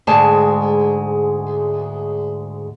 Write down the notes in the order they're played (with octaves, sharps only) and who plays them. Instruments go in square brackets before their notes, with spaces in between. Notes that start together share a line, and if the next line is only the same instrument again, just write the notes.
[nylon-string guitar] D2 G#2 G#3 A5